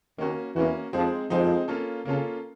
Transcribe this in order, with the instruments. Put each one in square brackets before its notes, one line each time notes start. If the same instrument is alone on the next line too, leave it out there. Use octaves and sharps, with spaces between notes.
[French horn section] D#2 D#3 [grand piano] A#3 C#4 F#4
[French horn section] E2 E3 [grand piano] A#3 C#4 F#4
[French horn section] F2 F3 [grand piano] G#3 C4 D#4 G#4
[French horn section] F2 F3 [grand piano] G#3 C4 D#4 G#4
[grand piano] A#3 C#4 F4 A4
[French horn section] C#3 [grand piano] A#3 C#4 F4 A4